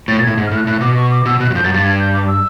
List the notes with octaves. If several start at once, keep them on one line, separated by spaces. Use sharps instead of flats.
A2 A6
A#2
A2 G#6
G#2
F6
A2 F#6
A2 F#6
B2 D6
C#6
D6
B2 E6
B2 F#6
F#2
F2 G6
F#2 A6
G2 A6
G#6
G6
D6
E6